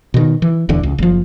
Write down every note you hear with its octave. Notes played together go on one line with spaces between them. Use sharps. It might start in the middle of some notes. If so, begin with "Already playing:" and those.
B2 D#3
E3
D#1 E2 D3
C#2
F#1 F3